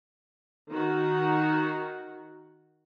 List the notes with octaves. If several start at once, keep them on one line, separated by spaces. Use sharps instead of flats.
D#3 F#4